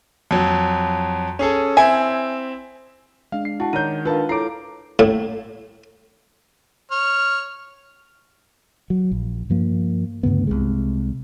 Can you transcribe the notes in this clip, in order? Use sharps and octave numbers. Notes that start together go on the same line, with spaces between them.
F2 F#3
C#4 G#4 A4
C4 E4 E5 G#5
G#3 D4 F5
C7
E4 F#4 A5
D#3 C#5 D5 F#5 A#5 G6 D#7
D4 D#4 F4 A#4 B4 F5 A5
E4 A4 C#5 A#5 D6 C7 D7
A2
C#5 F6
F#3
A#1
G2 F3 A#3
D2 G2 C#3 B3
C2 C3 G#3